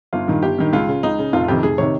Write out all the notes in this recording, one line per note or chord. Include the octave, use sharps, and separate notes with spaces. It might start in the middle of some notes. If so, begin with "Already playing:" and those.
G1 F4
G2 D#3
G1 G4
G2 D#3
C#2 F4
C#3
C#2 D#4
C#3
F1 F4
F4
F2 C3 D#3 G4
F1 G#4
C3 D#3 C#5